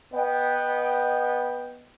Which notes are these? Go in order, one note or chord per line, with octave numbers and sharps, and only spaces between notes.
B3 D#5 G5